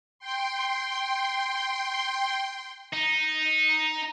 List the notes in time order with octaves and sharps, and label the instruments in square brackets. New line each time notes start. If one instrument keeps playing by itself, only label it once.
[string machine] G5 C6
[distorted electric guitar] D#4